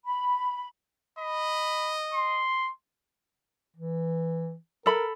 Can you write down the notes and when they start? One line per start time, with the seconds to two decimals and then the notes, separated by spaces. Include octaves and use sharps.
0.05 B5
1.19 D#5 B5
2.14 C6
3.77 E3
4.86 A4 A#4 B5